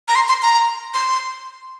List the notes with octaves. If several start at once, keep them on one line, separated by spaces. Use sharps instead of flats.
A#5
C6
C6
A#5
C6